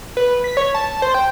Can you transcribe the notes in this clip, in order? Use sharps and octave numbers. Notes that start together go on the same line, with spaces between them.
B4
B6
C#5
A5
C5
G5